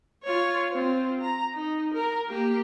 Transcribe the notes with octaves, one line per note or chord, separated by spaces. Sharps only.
F4 C#5
C4 F4
A#5
D#4
A#4
A#3 G4